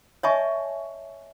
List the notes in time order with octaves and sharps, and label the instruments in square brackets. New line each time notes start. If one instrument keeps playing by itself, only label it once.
[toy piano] C#5 D#5 E5 G#5 A5 C#6